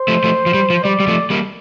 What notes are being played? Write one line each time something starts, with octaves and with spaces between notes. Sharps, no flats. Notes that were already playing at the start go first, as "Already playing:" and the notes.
Already playing: C5
F3 A3
F3 A3
F3
G3
F3
G3 D5
G3
F3 A3
G3 A#3